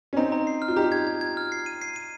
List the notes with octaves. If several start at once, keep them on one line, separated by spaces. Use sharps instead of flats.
C#4
C4 D#4 A#5
A#5
C7
F6
F4
D#4 G4 A#5
G#6
G#6
G#6
F6
C7
D#7
C7
D#7